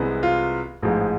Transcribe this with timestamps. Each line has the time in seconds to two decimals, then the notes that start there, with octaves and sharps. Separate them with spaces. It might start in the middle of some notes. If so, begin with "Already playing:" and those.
Already playing: C2 C3 E3 G#3 B3
0.23 F4
0.82 A1 G#2 F3 G#3